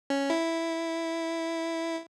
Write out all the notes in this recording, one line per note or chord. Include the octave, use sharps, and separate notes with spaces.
C#4
E4